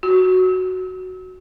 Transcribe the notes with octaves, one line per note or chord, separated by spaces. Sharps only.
F#4